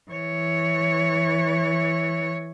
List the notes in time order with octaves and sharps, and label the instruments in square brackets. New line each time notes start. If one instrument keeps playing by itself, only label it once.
[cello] E3 C#5